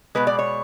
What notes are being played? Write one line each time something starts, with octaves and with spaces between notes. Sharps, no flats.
B2 G#3 B4
D5
C#5